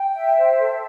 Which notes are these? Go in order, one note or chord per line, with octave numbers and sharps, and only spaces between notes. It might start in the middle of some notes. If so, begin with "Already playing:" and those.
Already playing: G5
E5
C5
A4